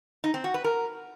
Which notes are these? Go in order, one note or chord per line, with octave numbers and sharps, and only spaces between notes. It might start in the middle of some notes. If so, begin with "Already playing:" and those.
D#4
C4
F#4
B4
A#4